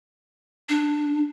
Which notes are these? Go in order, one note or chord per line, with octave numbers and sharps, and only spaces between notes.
D4